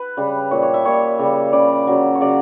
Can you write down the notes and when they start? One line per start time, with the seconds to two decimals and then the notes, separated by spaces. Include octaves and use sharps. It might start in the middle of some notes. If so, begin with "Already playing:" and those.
Already playing: B4
0.17 C#3 G3
0.51 A#2 G3 C#5
0.62 C#5
0.74 E5
0.85 A#2 G3 C#5
1.19 C#3 G3
1.53 C#3 G3 D5
1.87 C#3 F#3
2.15 C#5
2.21 C#3 F#3 D5